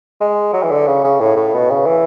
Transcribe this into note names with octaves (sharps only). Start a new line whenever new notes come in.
G#3
F#3
E3
D3
C#3
C#3
A2
A2
B2
C#3
E3